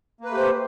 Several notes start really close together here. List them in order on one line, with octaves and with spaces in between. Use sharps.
A#3 B4 A3 G4 C5